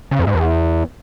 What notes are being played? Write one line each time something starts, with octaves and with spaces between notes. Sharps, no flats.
C#3
F2
G#2
E2